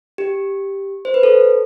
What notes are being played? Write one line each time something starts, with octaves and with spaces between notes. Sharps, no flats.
G4
C5
B4
A4